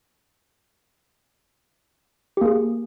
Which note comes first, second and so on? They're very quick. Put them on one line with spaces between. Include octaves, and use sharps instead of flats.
G4 A#3 G#4